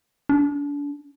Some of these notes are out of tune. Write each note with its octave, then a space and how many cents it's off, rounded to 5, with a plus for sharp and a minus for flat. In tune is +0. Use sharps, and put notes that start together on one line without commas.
D4 -35